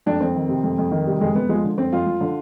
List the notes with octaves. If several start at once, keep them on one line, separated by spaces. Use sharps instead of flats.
F2 D4
F2 C4
D#3
C3
F2
F2
D#3
C3 G3
F2 G#3
F2 B3
F3 G#3
D3
F2 C4
F2 F4
F3
D3